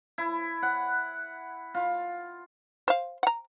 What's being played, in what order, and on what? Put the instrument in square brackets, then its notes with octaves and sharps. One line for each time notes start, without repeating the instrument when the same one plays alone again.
[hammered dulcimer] E4
F#5
F4
[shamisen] C5 F5
F#5 A#5